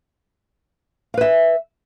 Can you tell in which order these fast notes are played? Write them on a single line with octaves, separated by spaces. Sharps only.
F5 B4 E5